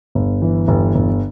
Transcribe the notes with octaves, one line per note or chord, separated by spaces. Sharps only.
G1
E3
G1
G1